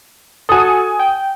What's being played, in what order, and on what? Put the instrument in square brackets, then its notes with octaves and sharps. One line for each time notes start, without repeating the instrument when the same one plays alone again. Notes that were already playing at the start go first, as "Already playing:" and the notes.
[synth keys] F#4 A4 [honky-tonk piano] G#5 D#6
[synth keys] G5